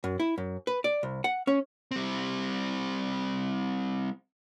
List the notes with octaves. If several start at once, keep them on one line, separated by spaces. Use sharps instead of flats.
F#2
E4
F#2
B4
D5
C2
F#5
C#4
G3 C4